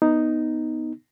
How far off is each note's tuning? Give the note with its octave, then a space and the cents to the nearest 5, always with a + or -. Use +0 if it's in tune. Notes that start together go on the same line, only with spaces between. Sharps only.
B3 +0 D#4 +0